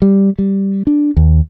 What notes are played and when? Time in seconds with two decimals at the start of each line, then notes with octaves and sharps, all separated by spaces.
0.02 G3
0.39 G3
0.87 D4
1.17 D#2